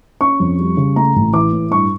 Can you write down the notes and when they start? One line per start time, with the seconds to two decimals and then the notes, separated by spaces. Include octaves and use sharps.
0.21 C#4 C#6
0.40 F2
0.59 G3
0.77 C#3
0.96 A3 A#5
1.16 A1
1.33 E3 D6
1.52 A2
1.71 G2 C#6